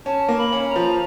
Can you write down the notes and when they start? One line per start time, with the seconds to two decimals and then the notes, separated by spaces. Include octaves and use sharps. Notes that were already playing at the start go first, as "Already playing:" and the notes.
0.05 C#4 A5
0.28 A#3
0.37 B5
0.52 C#4
0.68 A#5
0.76 F3